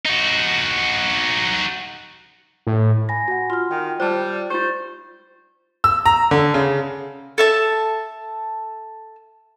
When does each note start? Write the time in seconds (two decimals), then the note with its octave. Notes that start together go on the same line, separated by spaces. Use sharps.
0.06 D#4 F#4
2.67 A2
3.09 G#5 B5 A#6
3.28 F#4 F#5
3.50 F4 C6 F6
3.71 D#3 G5
4.00 G3 F4 C5 A5
4.50 F4 G4 C5 G6 A6
5.84 E6
6.06 A#5
6.31 D3
6.54 C#3
7.38 A4 E5 A5